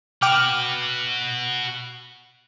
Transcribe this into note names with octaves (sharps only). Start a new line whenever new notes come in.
F#4 B4 G5 D6 F6